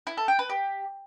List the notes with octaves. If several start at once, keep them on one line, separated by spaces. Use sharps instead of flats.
E4
A4
G5
B4
G4